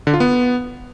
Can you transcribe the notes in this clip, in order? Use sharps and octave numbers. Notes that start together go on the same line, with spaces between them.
D3
F4
B3